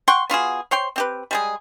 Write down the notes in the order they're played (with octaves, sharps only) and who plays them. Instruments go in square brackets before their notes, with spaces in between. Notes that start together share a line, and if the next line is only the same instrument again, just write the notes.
[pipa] F#5 G5 C6 C#6
B3 F4 F#4 G#4
C5 C#5 G5 C6
C4 G4 B4
G3 G#3 G#4